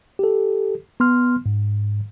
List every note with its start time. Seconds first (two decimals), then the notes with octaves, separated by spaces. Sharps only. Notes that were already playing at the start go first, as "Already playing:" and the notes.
0.19 G4 A4
1.00 B3 C6 F6
1.46 G#2